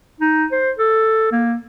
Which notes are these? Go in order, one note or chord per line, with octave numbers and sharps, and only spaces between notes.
D#4
C5
A4
A#3